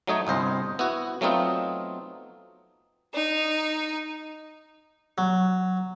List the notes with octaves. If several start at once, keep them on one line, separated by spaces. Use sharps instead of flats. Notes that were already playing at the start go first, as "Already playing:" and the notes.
F#3 A3 D#4 C#5
G1 C2 C5 D#5
B3 E4 F#4
F#3 A3 B3 C4 D#4 F4
D#4
F#3